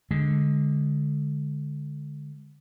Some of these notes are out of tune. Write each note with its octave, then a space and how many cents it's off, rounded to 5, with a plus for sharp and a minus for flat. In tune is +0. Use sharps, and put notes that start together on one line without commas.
D3 +0 G#3 +0